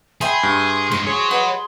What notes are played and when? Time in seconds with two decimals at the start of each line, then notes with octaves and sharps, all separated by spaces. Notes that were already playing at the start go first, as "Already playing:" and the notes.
0.21 G#4 E5 G5 B5 C6
0.43 G2
0.92 G2 G#3 C5
1.07 F#4 G#4 C#5
1.31 B4 D#5 F#5